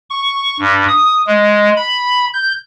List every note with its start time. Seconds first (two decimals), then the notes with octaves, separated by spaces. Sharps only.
0.10 C#6
0.59 G2
0.88 D#6
1.27 G#3
1.77 B5
2.33 G6